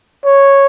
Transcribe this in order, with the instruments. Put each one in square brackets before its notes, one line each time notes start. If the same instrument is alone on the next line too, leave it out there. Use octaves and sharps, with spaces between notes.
[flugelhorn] C#5